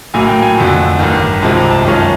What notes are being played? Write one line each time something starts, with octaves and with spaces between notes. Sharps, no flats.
A#1 A2 F#3 A#3 G#5
G5
G#5
F2 D3 F3 A3
A1 G2 D#3
C2 C3 F3 G#3 C4 A5
A#5
A5
F#2 D#3 G#3 C#4 F4 A5